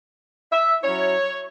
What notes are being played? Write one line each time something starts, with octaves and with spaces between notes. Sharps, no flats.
E5
F#3 C#4 E4 C#5